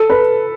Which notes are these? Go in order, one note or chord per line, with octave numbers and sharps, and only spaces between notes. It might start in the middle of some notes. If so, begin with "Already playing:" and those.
Already playing: A4
B4